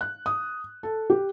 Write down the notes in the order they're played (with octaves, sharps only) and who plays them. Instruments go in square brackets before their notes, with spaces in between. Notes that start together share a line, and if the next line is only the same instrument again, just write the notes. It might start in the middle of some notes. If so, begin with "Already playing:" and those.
[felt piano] F#6
D#6
A4
G4